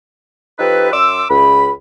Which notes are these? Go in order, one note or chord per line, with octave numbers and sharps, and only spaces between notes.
F3 D#4 G4 A4 B4
F#2 C6 D6 E6
C#2 B5